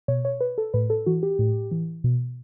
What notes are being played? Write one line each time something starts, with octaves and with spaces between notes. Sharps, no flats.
B2 C#5
C#5
B4
A4
A2 B4
A4
E3 F#4
G4
A2
E3
B2